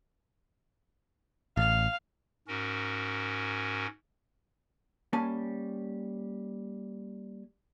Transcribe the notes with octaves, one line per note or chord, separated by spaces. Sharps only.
A1 F5
G#2 C#4 F#4 A#4
G3 A#3 C#4 G#5 A5